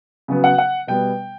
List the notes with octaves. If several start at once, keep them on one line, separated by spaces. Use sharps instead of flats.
C#3 F#3 B3
F#5
F#5
B2 G3 B3 G5